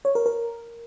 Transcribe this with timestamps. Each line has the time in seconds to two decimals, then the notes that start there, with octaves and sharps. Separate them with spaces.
0.05 C#5
0.15 A#4
0.26 A#4